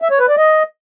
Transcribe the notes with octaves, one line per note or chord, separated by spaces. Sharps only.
E5
C#5
B4
D5
D#5